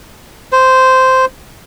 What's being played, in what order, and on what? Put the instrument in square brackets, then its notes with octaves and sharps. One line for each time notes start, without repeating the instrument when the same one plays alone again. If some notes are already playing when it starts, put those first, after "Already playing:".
[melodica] C5